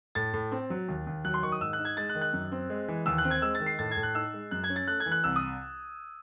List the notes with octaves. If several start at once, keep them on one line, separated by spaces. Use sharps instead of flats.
A2 A6
A2
C4
F#3
D#2
D#2
F#3 F#6
C6
D#3 C#6
D#6
G#2 E6
F#6
D#4
G#6
G#3 A6
F#6
D#3
F#6
F#2
C4
G#3
E3
D#2 E6
F#6
C4
G#6
G#3 E6
A6
D#3
C7
A2 A6
G#6
A2
F#6
D#4 E6
G#3
F#2 F#6
G#6
C#4
A6
A3 F#6
G#6
E3
F#6
C2 E6
D#6